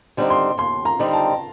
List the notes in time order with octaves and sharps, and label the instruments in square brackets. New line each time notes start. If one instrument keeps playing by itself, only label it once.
[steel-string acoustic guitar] D3 G3 C4 D#4
[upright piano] C6
[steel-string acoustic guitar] D#2 [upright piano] C6
[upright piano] A#5
[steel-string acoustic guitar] D3 G3 C4 D#4
[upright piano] A5